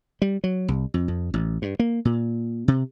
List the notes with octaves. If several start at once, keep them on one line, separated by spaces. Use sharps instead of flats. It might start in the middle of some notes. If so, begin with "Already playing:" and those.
G3
F#3
C2
F2
F2
A1
G2
A#3
A#2
C3